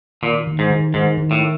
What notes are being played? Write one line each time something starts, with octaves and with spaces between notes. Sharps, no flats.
A#2 D#3
D#3
G#2
D#3
G#2 D#3
D#3
A2